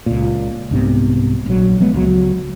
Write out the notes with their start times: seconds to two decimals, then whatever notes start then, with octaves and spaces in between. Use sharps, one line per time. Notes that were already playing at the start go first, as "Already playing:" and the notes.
0.06 C#2 A#2
0.71 C2 G#2 C3 B3
1.46 A#1 F#3
1.80 F3 G#3 B3
1.94 C#2 F#3